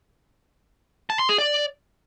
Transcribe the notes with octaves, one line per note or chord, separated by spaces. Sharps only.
A5
C6
G#4
D5